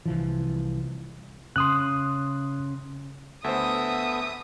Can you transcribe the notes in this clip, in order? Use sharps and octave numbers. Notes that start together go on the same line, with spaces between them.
C2 E3 F3
C#3 C6 D#6 F#6
D2 B3 A4 C5 E5 D#6